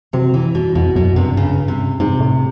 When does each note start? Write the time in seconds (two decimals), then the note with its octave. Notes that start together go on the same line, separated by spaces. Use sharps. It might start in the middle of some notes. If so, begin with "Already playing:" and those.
0.13 C3 F#3
0.34 E3
0.55 B2
0.75 F2 B2
0.96 F#2 B2
1.16 G2 C3
1.37 G2 C#3
1.68 C3
2.00 G#2 C3
2.20 A2